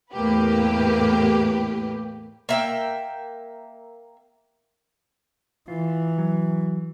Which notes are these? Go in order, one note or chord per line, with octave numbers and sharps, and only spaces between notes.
E2 A2 A#3 G4 B4
A#3 E5 G5
E3 F4
F#3